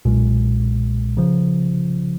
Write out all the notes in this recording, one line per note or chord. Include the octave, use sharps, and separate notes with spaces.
B1 A#2 G#3
C#3 F3